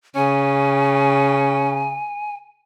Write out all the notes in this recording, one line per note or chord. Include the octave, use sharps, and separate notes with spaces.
C#3 C#4 G#5